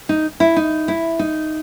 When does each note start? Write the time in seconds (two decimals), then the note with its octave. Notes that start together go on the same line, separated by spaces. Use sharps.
0.09 D#4
0.40 E4
0.56 D#4
0.88 E4
1.19 D#4